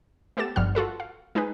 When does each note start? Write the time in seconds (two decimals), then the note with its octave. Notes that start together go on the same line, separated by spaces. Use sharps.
0.37 A3 B3 G4 A4 A6 E7
0.56 G1 G2 F3 G3 F#5 F6
0.75 F4 F#4 A4 B4
1.00 F5
1.35 G#3 D#4 G#4 B4